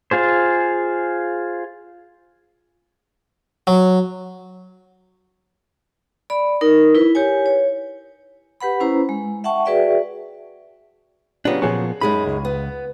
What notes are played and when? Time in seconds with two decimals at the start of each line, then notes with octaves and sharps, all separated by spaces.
0.11 F4 G#4 C5
3.67 F#3
6.30 D5 B5
6.61 D#4 A#4
6.95 E4 B4
7.15 G4 B4 C#5 G#5
7.46 C#5
8.61 G4 B4 F#5 B5
8.80 C#4 E4 B4 C5 A#5
9.09 G#3
9.44 E5 F#5 G5 A5 C#6
9.65 F#4 G#4 B4 D5 E5 G5
11.45 C#3 F#3 B3 C#4 D4 F4 G4
11.62 A#2 F3 B3 G#4 C#5
12.01 F#2 G#3 D#4 B5
12.26 C#2
12.45 B3